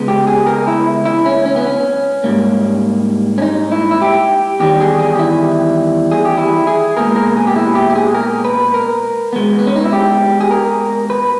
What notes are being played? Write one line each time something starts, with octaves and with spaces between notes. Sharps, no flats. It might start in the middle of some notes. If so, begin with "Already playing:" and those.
Already playing: C#3 G#3 B3
G4
G#4
A#4
E4
E4
C#4
C#4
B3
C#4
G#2 G3 A#3
C#4
D#4
E4
E4
G4
E2 D#3 G3 G4
G#4
G#4
G4
E4
G#4
G4
E4
G#4
A#2 G#3 B3 A#4
A#4
G#4
G4
E4
G4
G4
G#4
A#4
B4
A#4
B2 G#3 B3
B3
C#4
D#4
E4
G4
G#4
A#4
B4